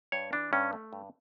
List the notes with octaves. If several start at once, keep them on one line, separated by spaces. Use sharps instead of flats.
G2 C#5
E3 D4
G2 C#4
A3
G2